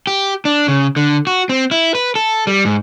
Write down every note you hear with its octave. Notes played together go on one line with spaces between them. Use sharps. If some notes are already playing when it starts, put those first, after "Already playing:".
G4
D4
C#3
D3
F#4
C4
E4
B4
A4
G3
G#2